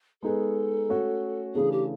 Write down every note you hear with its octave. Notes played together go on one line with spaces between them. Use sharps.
G#3 B3 D#4 G#4 A4 B4
A3 C#4 F#4
C#3 E3 A3 D4 G#4
G4